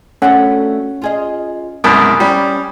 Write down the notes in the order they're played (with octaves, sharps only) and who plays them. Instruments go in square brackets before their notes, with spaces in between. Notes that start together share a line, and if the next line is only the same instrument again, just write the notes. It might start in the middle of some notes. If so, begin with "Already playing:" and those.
[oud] A3 D4 F#4 [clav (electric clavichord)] C#4 F#5
[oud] F4 G#4 D#5
[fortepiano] C2 F#2 B2 [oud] G#3 [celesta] B5 D#6
[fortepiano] G3 [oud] C#4 [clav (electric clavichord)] G5